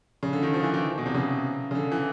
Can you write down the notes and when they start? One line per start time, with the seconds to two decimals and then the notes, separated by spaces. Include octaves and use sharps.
0.23 C#3
0.33 D3
0.43 D#3
0.54 F3
0.63 E3
0.74 D#3
0.98 B2
1.06 C3
1.14 C#3
1.71 C#3
1.75 D3
1.92 E3